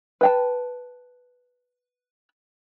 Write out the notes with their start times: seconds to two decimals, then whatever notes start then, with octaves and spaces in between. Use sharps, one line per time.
0.21 B4 G5 A5